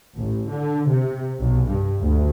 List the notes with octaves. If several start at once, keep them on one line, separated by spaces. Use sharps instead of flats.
A1
D3
C3
B1
G2
D2